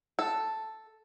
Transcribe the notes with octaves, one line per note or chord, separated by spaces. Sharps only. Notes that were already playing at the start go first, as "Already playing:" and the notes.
A4